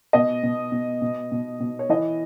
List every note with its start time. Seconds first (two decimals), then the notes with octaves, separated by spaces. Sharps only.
0.13 B2 D#5
0.43 B2
0.72 B2
1.02 B2
1.32 B2
1.60 B2
1.79 C#5
1.89 E3 D#5